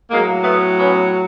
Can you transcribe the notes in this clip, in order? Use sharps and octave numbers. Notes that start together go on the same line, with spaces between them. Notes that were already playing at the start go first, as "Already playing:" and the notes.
A2 F#3 G#3 A#3
A3 B3
B3 C#4